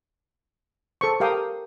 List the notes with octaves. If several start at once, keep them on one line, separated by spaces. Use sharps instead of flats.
A4 C5 C#6
G4 A#4 F5 G5 D6 D#6